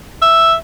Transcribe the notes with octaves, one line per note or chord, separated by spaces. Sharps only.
E5